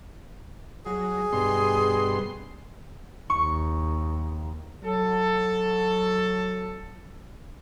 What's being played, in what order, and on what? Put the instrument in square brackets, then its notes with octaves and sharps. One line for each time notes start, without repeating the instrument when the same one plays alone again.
[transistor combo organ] F#3 [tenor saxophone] G#4
[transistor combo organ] G2 B2 C6
[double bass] D#2 [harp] C#6
[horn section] F#3 A4